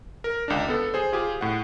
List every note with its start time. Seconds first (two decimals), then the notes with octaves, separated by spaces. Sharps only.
0.24 A#4
0.48 C#2 D4
0.68 B3 A4
0.94 G#4 C5
1.12 F4 G4 G#4
1.41 A2 F#5